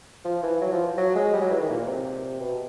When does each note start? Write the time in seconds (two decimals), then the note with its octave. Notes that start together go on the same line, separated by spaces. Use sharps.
0.25 F3
0.43 E3
0.61 F#3
0.72 F3
0.97 F#3
1.15 G#3
1.33 G3
1.41 F#3
1.50 E3
1.60 D#3
1.69 A#2
1.87 C3
2.40 B2